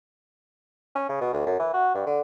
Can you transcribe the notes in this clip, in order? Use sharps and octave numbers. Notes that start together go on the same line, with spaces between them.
C#4
C#3
B2
D2
F#2
E3
F#4
G2
D3